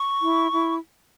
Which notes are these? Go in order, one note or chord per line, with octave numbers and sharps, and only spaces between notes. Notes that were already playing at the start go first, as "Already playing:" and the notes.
Already playing: C#6
E4
E4